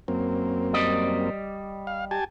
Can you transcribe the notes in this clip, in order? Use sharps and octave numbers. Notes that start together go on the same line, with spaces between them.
F#2 A#3 C4
G3 D5 D#5
F5
G4 G#5 A5